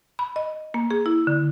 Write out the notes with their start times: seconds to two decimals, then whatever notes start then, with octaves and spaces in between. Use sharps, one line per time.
0.19 B5
0.36 D#5
0.74 A#3
0.91 G#4
1.06 E4
1.27 D3